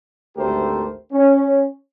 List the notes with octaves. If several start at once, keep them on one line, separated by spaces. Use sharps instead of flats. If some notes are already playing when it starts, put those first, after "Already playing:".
G#1 D2 A3 G4 A#4 C5
C#4